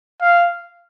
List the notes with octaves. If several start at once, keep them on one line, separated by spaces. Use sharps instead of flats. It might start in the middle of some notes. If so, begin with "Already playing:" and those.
F5